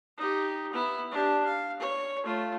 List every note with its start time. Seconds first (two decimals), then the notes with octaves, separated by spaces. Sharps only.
0.17 D#4 G4
0.73 B3 E4
1.11 D4 G4
1.45 F5
1.79 C#5
2.24 A3 F4